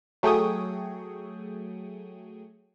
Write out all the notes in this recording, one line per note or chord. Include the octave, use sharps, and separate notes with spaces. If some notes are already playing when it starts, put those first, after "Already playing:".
F#3 A3 G#4 G5 C#6 D#6